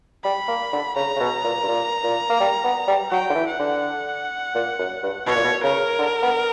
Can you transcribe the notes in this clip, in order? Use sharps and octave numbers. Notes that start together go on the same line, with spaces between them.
G3 B5
A#3
D3
C#3 A#5
C#3
B2
A#2
G2
A#2
A#2
A#3
G3
B3
G3
F#3 G5
D3
E3
F#5
D3
A#2
F#2
G2
B2 C#5
A#2
B2
C#3 A#4
D3
B3